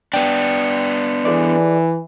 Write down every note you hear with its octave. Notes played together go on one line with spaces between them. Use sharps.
B3 D4 G5
E3 G#4 A4 D5